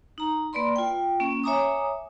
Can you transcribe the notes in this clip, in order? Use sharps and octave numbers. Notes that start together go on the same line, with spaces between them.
D#4 A#5
A#3 B4 D5 B5 C6
F4 G5
A#3 C#4
C#5 E5 G#5 A#5 D6 D#6